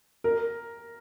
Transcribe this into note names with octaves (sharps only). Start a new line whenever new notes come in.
A#4